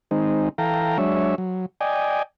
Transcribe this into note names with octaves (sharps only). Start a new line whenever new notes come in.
D#3 G#3 C4 D#4
E3 A4 F5 G5 A#5
F#3 G#3 D4 C#5 E5
F#3
D5 D#5 G5 G#5